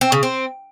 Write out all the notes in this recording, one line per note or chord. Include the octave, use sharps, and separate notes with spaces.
C4
C#3
C4